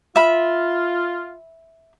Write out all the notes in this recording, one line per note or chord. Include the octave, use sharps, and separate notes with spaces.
F4 E5 B5